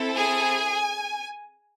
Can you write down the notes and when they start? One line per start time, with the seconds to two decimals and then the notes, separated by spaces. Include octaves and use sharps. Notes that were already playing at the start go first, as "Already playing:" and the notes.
Already playing: C4 E4 A4
0.16 G#4 G#5